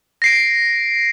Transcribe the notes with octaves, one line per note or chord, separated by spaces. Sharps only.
A#6 C7 D7